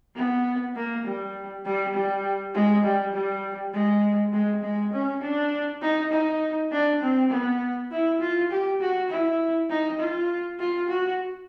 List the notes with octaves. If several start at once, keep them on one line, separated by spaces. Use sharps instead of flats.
B3
A#3
G3
G3
G3
G#3
G3
G3
G#3
G#3
G#3
C#4
D4
D#4
D#4
D4
C4
B3
E4
F4
G4
F#4
E4
D#4
F4
F4
F#4